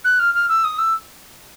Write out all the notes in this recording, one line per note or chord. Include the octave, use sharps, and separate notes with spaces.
F#6
F6
F6
E6
D#6
E6